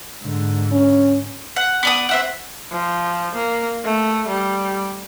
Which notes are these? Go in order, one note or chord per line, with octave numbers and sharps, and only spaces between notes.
G#2 D3
C#4
F#5
B3 D5 D#6
C4 E5 F#5
F3
A#3
A3
G3